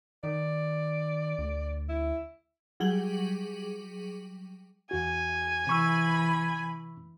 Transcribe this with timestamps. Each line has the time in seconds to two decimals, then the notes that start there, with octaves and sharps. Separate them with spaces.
0.24 D#3 D5
1.39 D2
1.89 E4
2.80 F#3 G3 G#4 G5 F#7
4.91 E2 F#4 G#5
5.67 C3 E3 B5 C#6 E6